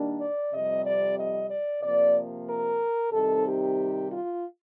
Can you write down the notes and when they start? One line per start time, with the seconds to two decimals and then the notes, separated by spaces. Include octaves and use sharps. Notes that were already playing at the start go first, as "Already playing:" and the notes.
Already playing: D#3 G3 A#3 D4
0.20 D5
0.52 F2 C3 G3 D#5
0.84 D5
1.17 D#5
1.50 D5
1.82 C3 F3 A#3 D5
2.48 A#4
3.12 C3 D#3 G3 C4 D#4 A4
3.45 G4
4.09 F4